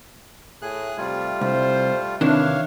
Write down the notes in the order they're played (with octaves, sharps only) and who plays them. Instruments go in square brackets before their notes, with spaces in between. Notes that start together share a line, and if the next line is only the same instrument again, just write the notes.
[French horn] A2 [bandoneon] G#4 F#6
[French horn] C3 [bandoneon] G3 A3 F4
[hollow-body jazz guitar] C2 [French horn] C5
[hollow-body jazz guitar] C3 D#3 E3 [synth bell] D4 [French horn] E4 [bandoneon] C#5 F5